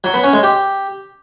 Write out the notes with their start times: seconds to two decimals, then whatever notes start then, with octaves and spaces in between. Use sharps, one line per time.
0.04 F#3
0.14 B3
0.23 C#4
0.33 G#3
0.43 G4